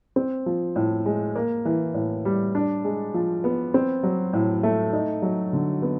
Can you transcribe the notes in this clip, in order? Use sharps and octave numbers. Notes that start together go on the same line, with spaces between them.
C4
F3
A2
G#3
A#3
E3
A2
G3
D4
G#3
F3
B3
C4
F#3
A2
A3
D#4
F#3
D3
B3